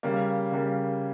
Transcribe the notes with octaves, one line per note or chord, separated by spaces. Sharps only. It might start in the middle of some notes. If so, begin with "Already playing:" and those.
C#3 G3 A#3
C#3 G3 A#3